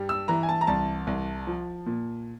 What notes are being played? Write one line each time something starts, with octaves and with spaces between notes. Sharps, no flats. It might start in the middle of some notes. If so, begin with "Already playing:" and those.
Already playing: G2 G3
E6
E3 A#5
G#5
A5
A#5
C2 A5
C2
F3
A#2